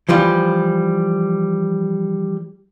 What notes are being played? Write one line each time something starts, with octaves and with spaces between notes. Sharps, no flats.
E3 F3 G3 F4